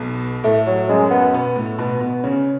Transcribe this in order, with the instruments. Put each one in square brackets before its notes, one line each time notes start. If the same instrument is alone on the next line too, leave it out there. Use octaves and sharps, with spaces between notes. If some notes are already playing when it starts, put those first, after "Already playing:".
Already playing: [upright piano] B1 B2
[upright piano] A2 [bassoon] A3
[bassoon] F#3
[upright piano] F#2 F#3 [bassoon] G#3
[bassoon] B3
[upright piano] B2 B3
A2 A3
B2 B3
B2 B3
C#3 C#4